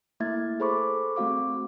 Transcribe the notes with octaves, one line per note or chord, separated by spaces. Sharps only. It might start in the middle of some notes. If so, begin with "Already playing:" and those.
A3 A#3 E4 E5 G#6 A6
G#4 A4 C5 B5 C#6 D6
A3 C4 F#4 F5 D6